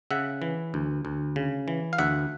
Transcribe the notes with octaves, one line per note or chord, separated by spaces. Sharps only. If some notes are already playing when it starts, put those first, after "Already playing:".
C#3 E5 F#5
E3
D2
D2
C#3
E3
F5
D2 E5 F#5